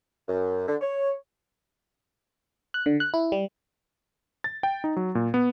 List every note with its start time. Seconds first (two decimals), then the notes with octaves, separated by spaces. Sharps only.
0.28 F#2
0.67 D3
0.81 C#5
2.74 F#6
2.86 D3
3.00 F#6
3.14 E4
3.32 G3
4.44 A6
4.63 G5
4.84 D#4
4.96 F#3
5.15 A#2
5.34 B3